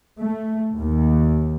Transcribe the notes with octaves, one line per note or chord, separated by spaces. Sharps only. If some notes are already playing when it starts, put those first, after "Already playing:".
A3
D#2